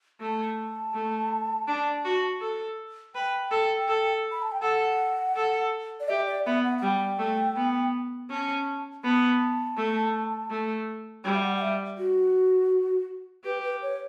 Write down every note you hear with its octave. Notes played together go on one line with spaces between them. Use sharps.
A3 A5
A3
D4
F#4
A4
B4 G5
A4
A4
B5
A5
G5
A4 F#5
A4
D5
G4 E5
D5
B3 E5
F#5
F#5
G3 G5
A3
B3
C#4 A5
B3 A5
A3
A3
G3 G5
E5
F#5
F#5
E5
F#4
G4 B4
B4
C#5